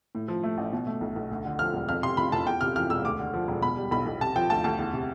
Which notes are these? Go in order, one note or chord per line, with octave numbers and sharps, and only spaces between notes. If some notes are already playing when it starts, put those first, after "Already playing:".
A2
F3
A3
A1
B2
A3
B1
B1
D2
D3
F3 F6
E1
F2 F6
C3 C6
F1 B5
F1 A5
E2 G5
C3 F6
E3 F6
E1 E6
D2 D6
D3
F3
E1
B2 B5
G3
B1 B5
B1
C3 A5
F3 G5
D2 A5
D2 A5
E2
C3